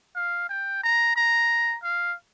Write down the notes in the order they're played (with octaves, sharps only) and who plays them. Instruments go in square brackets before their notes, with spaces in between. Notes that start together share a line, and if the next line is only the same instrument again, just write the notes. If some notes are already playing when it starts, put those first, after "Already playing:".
[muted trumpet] F5
G5
A#5
A#5
F5